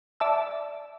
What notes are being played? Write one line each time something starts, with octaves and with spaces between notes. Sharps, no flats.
D5 E5 A5 E6